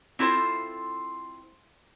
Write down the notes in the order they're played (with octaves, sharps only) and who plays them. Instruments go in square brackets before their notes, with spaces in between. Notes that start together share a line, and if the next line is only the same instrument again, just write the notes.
[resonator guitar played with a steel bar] C4 E4 F4 A4 C5